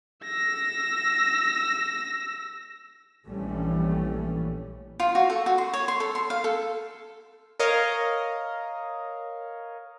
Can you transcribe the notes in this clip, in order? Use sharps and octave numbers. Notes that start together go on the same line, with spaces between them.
E6 A#6
A#1 E3 G3 A3 C#4
F4
F#4
A4
F#4
C6
C#5
C6
A4
C6
F5
A4
A#4 C#5 D#5 F5